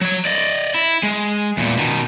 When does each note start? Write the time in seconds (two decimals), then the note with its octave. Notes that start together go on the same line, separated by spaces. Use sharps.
0.01 F#3 C#5
0.25 D5 D#5
0.74 E4
1.03 G#3
1.57 E2 A#2
1.77 B2 D#3